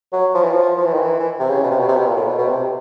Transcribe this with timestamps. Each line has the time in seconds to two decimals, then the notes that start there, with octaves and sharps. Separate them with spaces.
0.13 F#3
0.34 F3
0.43 E3
0.51 F3
0.77 F3
0.85 E3
0.93 D#3
1.00 E3
1.20 E3
1.39 C3
1.49 C#3
1.64 B2
1.71 C3
1.80 B2
1.88 C3
1.97 B2
2.06 A#2
2.16 A2
2.27 B2
2.38 B2
2.49 C3